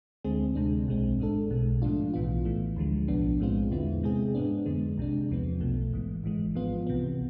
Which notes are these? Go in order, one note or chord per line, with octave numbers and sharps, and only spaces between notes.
D2 D3 G#3 C4 G#4
D2 C3 G#3 D4
B1 B2 G#3 C4
G#1 G#2 G#3 D4 A4
B1 B2 G#3
G#2 F3 A3 D4 F4
B1 A2 E3 B3 F4
A1 A2 E3 A3
D2 D3 F3 G#3
B1 A2 F3 B3 D4
B1 A2 G#3 C4 F4
E2 D3 G#3 B3 E4
C3 G#3 C4 G#4
G#2 G#3 B3 D4
F2 D3 G#3
C2 C3 G#3 D4
E2 C3 F3 B3
B1 B2 A3
G#1 G#2 E3
G#1 G#2 E3 G#3
G#2 F3 B3 F4
C2 C3 E3 B3